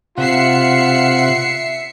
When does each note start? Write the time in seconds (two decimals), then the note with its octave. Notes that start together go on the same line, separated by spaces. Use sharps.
0.18 C3 F4 E5 F#5 C7 C#7